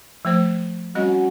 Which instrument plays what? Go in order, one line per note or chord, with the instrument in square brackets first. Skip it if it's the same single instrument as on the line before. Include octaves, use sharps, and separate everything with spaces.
[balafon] F3 A3 C5
[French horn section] F#3 C#4 F#4 [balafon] G3 C4 D#5